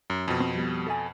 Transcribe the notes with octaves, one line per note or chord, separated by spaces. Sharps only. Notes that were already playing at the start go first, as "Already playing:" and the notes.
F#2
F2 B2
C4
F3 G3 B3
A4 E5 G#5